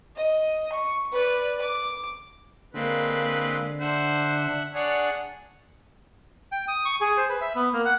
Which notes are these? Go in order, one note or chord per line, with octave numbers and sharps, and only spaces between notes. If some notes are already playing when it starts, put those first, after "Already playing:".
D#5
C#6
B4 D5
D6
D3 G#3 A#3 C4 B4
D4 C5 E5 F#5
D4 G#4 C#5 D5 F#5
G5
D#6
C#6
G#4
C5
B4
E5
B3
A#3
F#5